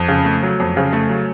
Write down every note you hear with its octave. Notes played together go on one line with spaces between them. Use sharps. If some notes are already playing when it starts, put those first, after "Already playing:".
Already playing: F2
C#3
A3
F#3
F2
C#3
A3
F#3